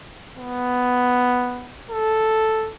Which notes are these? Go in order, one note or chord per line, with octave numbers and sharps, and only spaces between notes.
B3
A4